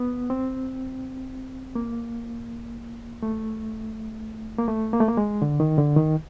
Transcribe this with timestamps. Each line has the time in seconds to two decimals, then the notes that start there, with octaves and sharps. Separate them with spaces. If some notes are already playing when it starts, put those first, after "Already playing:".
Already playing: B3
0.30 C4
1.75 A#3
3.23 A3
4.58 A#3
4.68 A3
4.93 A#3
5.00 A3
5.08 A#3
5.17 G#3
5.42 D3
5.60 D#3
5.78 D3
5.96 D#3